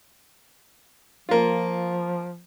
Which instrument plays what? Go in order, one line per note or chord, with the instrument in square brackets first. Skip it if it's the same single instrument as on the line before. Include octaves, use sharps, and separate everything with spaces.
[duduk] F3 [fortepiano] A#3 F4